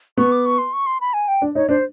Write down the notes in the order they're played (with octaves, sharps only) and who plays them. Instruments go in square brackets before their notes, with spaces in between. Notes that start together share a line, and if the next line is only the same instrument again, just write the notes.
[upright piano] B3 [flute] C#6
[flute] D6
C#6
C6
C#6
C6
B5
G#5
G5
[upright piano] D4
[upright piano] D#4 [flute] C#5
[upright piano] D4 [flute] C5